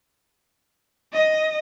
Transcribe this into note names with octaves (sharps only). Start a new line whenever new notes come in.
D#5